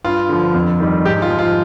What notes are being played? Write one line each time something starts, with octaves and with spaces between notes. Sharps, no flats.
G2 F4
D3 F3
F2
D#3 G3
G#2 G4
F4
F3
F4